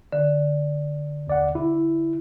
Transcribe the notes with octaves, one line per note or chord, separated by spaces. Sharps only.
D3
D#2 D5 F#5
E4